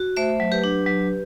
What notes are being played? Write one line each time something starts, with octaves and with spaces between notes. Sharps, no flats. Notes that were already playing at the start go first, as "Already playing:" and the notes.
Already playing: F#4
A3 C5 E5
F#3
G4 B4
D4
F#3